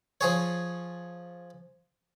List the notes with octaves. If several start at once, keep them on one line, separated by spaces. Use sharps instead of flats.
F3 G#4 C#5